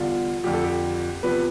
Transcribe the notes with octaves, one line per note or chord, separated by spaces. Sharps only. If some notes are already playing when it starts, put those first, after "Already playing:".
Already playing: E2 D3 G3 F4
F2 D3 F3 G4
A4
G4
E2 C3 F3 B4